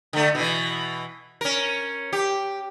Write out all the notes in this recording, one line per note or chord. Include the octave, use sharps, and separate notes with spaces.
D3 A3
B2 E3
C#4 A#4
G4